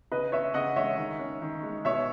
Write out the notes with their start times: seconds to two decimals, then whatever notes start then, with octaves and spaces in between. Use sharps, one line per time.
0.12 C#3 B4 D#5
0.32 C#4 C#5 E5
0.54 C#3 D#5 F#5
0.76 G#3 C#5 E5
0.97 D#3
1.19 C#4
1.42 D#3
1.63 G#3
1.85 B2 C#5 E5